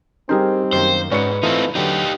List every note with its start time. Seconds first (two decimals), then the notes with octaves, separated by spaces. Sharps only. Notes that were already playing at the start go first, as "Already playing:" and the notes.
0.29 G3 C4 D#4 G#4 A#4 C5
0.73 F#2 D#3 A#3 C5
1.11 G#2 C#4 F#4 B4 D5 C#7
1.43 E3 A3 C4 D#4 F4
1.75 D3 F#3 D#4 G4